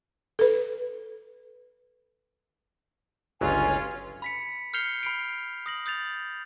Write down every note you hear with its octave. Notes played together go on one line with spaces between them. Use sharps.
A4 B4
G1 C#2 F#3 C#4 F4 G#5
B5 B6 C#7
F6 G6 C7 C#7 F7 G7
B5 C7 D7
D#6 A#6 F#7
D#6 G6 A6 F7